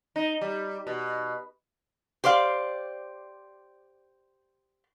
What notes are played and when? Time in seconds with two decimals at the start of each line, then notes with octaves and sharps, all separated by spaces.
0.16 D#4
0.41 G3
0.87 B2
2.24 G4 C5 D5 F5